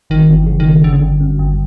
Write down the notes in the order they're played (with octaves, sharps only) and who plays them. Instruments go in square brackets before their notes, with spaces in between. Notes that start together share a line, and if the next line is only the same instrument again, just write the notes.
[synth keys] G1 [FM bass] D#3
[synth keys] G1
[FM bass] E3
[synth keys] C#3
[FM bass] D#3
[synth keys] G1
[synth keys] G1 [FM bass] D3
[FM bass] C#3
[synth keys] G1 [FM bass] D3
[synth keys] F#2
G1